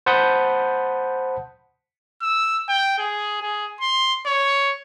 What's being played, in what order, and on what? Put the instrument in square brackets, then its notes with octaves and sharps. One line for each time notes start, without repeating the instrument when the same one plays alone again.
[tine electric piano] C5 F#5 A5 B5 D#6 G6
[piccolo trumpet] E6
G5
G#4
G#4
C6
C#5